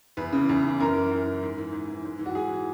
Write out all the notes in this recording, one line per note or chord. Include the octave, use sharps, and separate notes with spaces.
E2 B4
C#3 E3
E2
C#3 E3
F#2 A#4
E3
F#2
E3
G#2
E3
G#2
E3
G#2
E3
F#4
G#2 G#4
E3